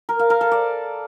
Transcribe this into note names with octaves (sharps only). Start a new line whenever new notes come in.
A#4
F5
A#4
A4
D5